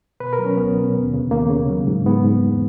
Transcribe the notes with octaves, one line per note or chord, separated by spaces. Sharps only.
B2 B4
A#4
F#3
C#4
C#2 B3
B2
D#2
C#3
D#2 A#3
C#3
F#3
G#2
G#2 B3
G#2
E2